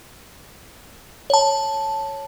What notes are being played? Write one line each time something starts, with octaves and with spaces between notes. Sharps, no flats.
C#5 A5